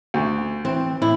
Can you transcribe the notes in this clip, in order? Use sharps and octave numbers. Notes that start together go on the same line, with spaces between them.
D2
E3 C4
A2 E4